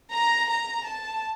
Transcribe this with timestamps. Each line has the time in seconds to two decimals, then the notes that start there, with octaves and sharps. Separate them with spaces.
0.11 A#5
0.49 A#5
0.86 A5